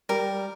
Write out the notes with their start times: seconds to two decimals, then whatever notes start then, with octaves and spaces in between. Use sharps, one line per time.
0.09 G3 A#4